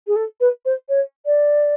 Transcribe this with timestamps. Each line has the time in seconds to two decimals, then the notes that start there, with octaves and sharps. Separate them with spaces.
0.07 G#4
0.15 A4
0.40 B4
0.65 C5
0.89 C#5
1.25 D5